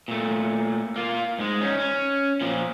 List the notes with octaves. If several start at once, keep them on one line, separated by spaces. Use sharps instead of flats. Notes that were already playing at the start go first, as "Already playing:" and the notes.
A#2 A3
A#3 F4
G#2 G#3
C#4 D#4
C#4
A#2 F3